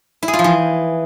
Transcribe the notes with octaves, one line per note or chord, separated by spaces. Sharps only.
E4
G#4
F4
F3
E3